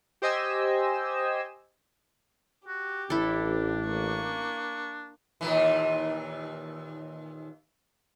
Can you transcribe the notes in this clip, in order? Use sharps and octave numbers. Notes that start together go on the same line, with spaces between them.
G4 C5 D#5 G#5 E6
F#4 G4
A1 D4 E4 A4
A#3 C#6
D#2 A#2 E3